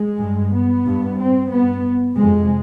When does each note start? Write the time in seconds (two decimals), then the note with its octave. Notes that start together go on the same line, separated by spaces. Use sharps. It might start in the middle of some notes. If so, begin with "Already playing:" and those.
Already playing: G#3
0.20 G2
0.53 B3
0.86 G2
1.18 C4
1.51 G2 B3
2.16 F2 C3 G#3